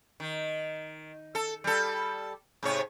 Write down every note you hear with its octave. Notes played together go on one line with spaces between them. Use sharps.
D#3
A4
G3 A4
G#2 C3 C#5